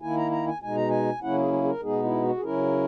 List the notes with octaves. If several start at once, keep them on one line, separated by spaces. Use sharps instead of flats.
D#3 A#3 E4 G#5
A#5
A#5
G#5
B2 G#3 D#4 G#5
A#5
G#5
C#3 F#3 A#3 C#4 E4 F#5
G#4
G#4
G#4
A#4
B2 G#3 B3 D#4 G#4
E4
F#4
G#4
C#3 F#3 C#4 E4 A#4